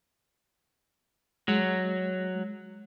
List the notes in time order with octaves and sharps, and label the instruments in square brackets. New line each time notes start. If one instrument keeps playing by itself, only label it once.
[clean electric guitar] F#3 [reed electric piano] G#3